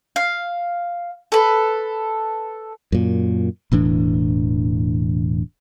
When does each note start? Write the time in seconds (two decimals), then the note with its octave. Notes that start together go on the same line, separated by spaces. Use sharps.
0.16 F5
1.32 A4 B4
2.92 F#2 A#2
3.72 E1 A2 E3 D4